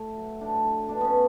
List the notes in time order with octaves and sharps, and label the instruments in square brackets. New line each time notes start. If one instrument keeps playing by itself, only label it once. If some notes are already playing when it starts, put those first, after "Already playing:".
Already playing: [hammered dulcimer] A2 A3
F#3
A2 D4
A2
B2 D4
B3 C#4
F#3